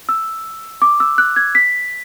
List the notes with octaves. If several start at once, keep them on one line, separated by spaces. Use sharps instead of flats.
E6
D6
E6
F#6
G#6
B6